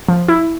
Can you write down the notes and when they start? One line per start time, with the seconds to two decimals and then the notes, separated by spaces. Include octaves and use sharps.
0.09 F3
0.28 E4